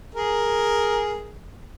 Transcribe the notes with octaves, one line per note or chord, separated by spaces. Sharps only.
G#4 A#4